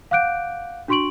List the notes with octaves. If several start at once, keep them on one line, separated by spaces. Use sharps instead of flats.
F5 F#5 D6 F#6 G6 D7
D4 F#4 C6 C#6 D7 F#7